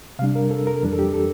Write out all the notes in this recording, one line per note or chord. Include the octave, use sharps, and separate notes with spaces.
C3 G3 D4 F5
A#4
A4
A#4
F2 E3 G3 D4
A4
G4
A4